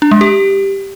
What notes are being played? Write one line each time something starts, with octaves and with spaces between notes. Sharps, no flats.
D4
G#3
G4